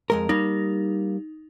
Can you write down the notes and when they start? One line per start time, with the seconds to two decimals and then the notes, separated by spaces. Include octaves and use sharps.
0.10 F2 G#3 A#4
0.29 G3 A#3 D#4